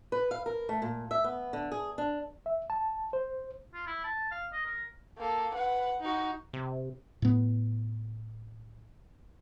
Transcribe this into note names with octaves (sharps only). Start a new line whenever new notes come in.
B4
F5
A#4
A3
A#2
E5
B3
D3
G#4
D4
E5
A5
C5
F4
E4
A5
F5
D#5
A#4
A#3 A4
B4 F#5
D#4 F#4
C3
A2 B3